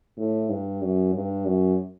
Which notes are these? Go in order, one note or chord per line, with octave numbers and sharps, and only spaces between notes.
A2
G2
F#2
G2
F#2